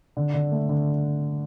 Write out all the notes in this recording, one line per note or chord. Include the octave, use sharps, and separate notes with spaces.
D3
D3
A3
D3